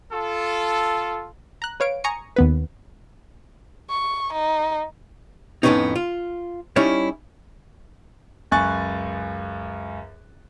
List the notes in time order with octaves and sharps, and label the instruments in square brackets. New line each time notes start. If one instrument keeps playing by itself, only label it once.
[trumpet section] F4 A4
[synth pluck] A#5 F#6
B4 C#5 F5 D7
G#5 A#5 C#6 D#6 C#7
D#2 B3 B4
[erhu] C#6
D#4
[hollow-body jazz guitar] F2 A2 D#3 B3 C#4 D#4
F4
G3 C#4 D#4 E4 C#5
[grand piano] C#2 F#2 G#5 C#6 F#6 A6